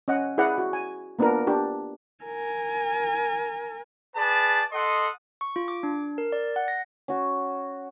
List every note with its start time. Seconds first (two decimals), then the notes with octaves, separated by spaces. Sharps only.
0.08 C#4 D#5 F#5
0.38 E4 G#4 B4 D5 F#5
0.58 F#4
0.73 G#5
1.19 A#3 B3 D4 F4 A#4
1.47 D4 G4
2.24 A#4 G#5
4.16 G#4 B4 D5 A5
4.72 A4 D#5 F#5 C6 D#6
5.41 C#6
5.56 F4
5.68 D6
5.83 D4
6.18 A#4
6.32 D5
6.56 F#5
6.68 A#6
7.08 C#4 F#4